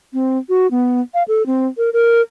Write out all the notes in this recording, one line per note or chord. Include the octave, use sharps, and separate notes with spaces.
C4
F#4
B3
F5
A4
C4
A#4
A#4